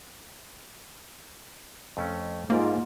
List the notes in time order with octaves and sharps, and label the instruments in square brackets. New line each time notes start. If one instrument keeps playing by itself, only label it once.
[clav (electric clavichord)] F2 A3 C#4
[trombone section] G#2 [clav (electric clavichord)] G3 A#4 D5 [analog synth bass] A#3 [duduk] F4